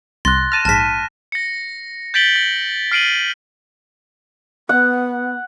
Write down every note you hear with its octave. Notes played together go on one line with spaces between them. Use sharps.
C2 C6 F#6 A6 A#6
A5 F6 A#6 D#7 E7
A#1 G#2 A5 F6 A#6 B6
A#6 C#7
G6 A6 B6 D7 F#7 G7
A#6
F6 C7 D7 D#7 F#7
B3 F#5